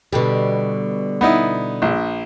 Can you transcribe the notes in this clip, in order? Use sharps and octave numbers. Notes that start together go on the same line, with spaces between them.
B2 D3 G3
B3 D#4 E4
A#1